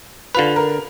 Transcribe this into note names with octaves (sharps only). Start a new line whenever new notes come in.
D3 F4 B4 F7
A#4